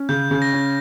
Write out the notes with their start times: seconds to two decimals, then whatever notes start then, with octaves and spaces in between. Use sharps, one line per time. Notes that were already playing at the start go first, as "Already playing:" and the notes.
Already playing: C#4
0.09 C#3 G6
0.31 C#3
0.42 A#6
0.53 C#4